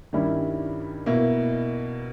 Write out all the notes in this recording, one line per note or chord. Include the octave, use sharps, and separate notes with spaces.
G2 D#3 G3 C#4 E4
B2 A#3 E4